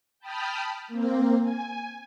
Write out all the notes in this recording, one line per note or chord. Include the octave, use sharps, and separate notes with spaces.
G5 A5 B5 D#6 F6 G6
A#3 C4
G#5